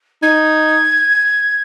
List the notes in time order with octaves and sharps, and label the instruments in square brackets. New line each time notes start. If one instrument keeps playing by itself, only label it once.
[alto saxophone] D#4 [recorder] G#6